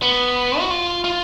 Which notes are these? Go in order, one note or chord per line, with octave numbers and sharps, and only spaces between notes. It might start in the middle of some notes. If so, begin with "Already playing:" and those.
B3
F#4
F4
F4